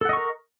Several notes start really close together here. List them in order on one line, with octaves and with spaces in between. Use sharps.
A4 F#5 D#5 C#6 A#4